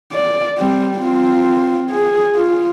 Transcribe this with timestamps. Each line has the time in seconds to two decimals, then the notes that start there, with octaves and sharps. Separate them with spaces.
0.12 D5
0.58 G3 C4
0.95 C4 F4
1.90 G#4
2.36 F4